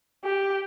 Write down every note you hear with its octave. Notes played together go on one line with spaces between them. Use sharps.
G4